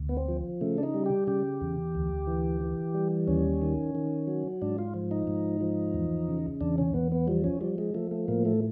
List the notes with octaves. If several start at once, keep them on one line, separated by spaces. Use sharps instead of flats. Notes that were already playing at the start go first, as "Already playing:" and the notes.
Already playing: D2
B3
C4
F3
C#3 A3
D4
D#4
G3
G4
C#3 G4
E2
D2
E3
E3
G3
D#2 C#4
D#3
D#3
F#3
G#2 D4
F4
F3
D#4
G#2
F3
E2
C#3
E2 D4
C#4
E2 B3
B3
F3 G3
C#4
F3 G3
G#3
F3 A3
A3
A2 A#3
A3